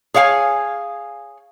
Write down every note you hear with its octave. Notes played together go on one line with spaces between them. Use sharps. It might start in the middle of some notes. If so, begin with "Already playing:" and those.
G#4 C#5 F5 F#5 G#5